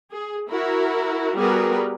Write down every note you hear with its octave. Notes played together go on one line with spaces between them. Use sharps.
G#4
E4 F#4 A#4
G3 B3 F#4 G#4 A#4 B4